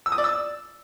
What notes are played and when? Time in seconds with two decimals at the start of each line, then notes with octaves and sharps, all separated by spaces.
0.06 E6
0.12 D#6
0.18 D5
0.24 E6